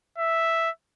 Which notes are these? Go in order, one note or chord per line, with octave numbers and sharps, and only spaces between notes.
E5